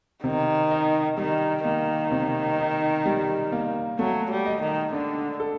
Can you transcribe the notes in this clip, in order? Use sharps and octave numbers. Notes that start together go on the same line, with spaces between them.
C3 D#3
D#4
D#3 G3
D#3 A#3
C3
D#4
G3
A#3
F#3 A3
G3
D#5
D#3
D3 D4
A4